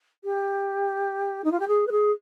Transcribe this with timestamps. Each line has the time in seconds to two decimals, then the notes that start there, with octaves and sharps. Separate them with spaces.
0.24 G4
1.44 D#4
1.52 F4
1.60 G4
1.68 G#4
1.87 B4
1.92 G#4